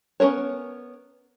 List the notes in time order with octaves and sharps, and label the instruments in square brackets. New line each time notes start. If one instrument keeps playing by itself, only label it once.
[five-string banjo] B3 C#4 A#4 C5 C#5